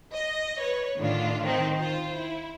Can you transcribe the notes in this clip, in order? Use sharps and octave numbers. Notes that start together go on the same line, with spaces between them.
D#5
B4 C#5
A2 D3 D#3 D4 F4
D#3 C4 D#4
F4 C5
E4